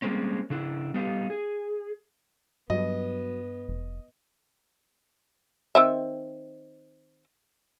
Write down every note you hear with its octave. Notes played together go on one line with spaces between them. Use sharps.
G3 G#3 A#3 C4 C#4
C#3 D4 E4
G3 B3 D#4 G4 F5
G#4
G2 F#3 B3 D#5
F1
D#3 C4 E5